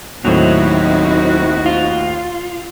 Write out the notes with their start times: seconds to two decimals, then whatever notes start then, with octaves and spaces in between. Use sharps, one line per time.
0.25 D#2 A2 F#3 C4 D#4 E4 F#4 C5
1.66 F4